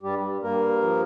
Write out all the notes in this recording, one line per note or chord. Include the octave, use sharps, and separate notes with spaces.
G2 G3 G4
G2 A#3 A#4
F3